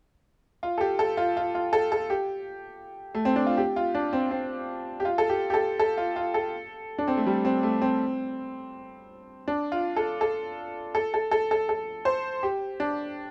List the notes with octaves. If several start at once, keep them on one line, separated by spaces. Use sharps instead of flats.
F4
A4
G4
A4
F4
F4
F4
A4
A4
G4
A3
C4
D4
F4
G4
F4
D4
C4
C4
G4
F4
A4
G4
G4
A4
A4
F4
F4
A4
D4
C4
A3
G3
C4
A3
C4
D4
F4
A4
A4
A4
A4
A4
A4
A4
C5
G4
D4